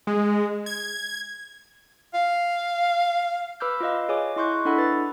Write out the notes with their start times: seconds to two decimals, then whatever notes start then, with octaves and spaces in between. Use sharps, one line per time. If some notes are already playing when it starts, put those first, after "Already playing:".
0.07 G#3
0.66 G#6
2.14 F5
3.60 B4 B5 D6 E6 F6 G6
3.80 F4 B4 D#5 F5
4.09 G#4 C#5 G#5 D6
4.36 E4 D#5 C6 C#6 F#6 G6
4.65 D4 E4 A4 F#5 B5
4.78 B4 A6